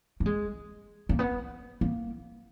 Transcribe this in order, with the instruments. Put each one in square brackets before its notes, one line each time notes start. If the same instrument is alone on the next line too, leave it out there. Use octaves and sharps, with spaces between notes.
[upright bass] A#3
G#3
A#3
B3
A#3